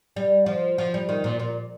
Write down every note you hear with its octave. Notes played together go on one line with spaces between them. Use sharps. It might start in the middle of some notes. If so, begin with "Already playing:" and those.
G3
F3
F3
G3
D#3
A#2
A#2